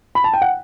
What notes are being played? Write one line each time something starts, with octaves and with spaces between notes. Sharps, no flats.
B5
A5
G5
F#5